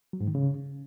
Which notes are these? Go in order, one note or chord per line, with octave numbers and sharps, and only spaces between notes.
F#3
G#2
D#3
C#3